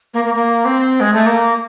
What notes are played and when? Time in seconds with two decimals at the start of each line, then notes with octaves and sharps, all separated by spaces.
0.14 A#3
0.24 A#3
0.34 A#3
0.65 C4
1.00 G#3
1.13 A3
1.26 A#3